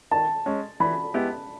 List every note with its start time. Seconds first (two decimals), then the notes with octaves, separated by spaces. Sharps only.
0.11 D#3 A5
0.46 G#3 C#4
0.80 E3 B5
1.14 G#3 B3 E4 G4